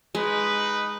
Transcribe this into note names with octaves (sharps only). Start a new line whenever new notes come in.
G#3 D#4 B4